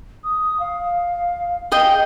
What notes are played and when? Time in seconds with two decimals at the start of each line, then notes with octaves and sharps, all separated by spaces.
0.24 D#6
0.60 F5
1.72 G#4 D#5 G5